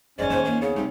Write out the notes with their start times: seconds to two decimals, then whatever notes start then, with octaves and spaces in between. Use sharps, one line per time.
0.19 F#1 G#2 C#4 E4 D5
0.30 D#2 C5
0.45 A#3
0.61 C#3 B3
0.76 C3 G3 D#4